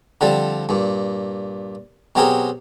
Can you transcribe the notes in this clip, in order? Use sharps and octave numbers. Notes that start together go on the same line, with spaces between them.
D3 F3 G3 C4
G2 A#2
B2 F#3 C4 G4 G#4 A#4